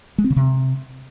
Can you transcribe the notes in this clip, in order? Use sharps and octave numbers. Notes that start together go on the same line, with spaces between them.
G#3
C4
C#3
C3